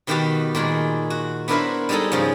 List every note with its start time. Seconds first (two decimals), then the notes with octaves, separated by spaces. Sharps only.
0.07 B2 D#3 F#4 G4 B4 A5
0.55 A#2 D#3 G#3
1.10 F#4
1.48 B3 D4 E4 A#4 C5 E5
1.89 G3 G#3 D#4 G#4 A4 D#5
2.12 G#2 C#3 F3